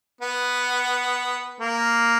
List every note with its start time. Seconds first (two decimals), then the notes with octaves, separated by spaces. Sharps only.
0.21 B3
1.60 A#3